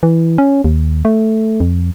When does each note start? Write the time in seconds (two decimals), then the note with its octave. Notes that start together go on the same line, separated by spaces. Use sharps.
0.03 E3
0.38 C#4
0.64 D#2
1.05 A3
1.60 F2